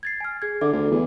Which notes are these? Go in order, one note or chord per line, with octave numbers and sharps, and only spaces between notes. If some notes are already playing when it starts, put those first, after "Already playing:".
G#6 A6 C7
G#5 F6
G#4 G#6
D3 A4 E5 D6
D2
E2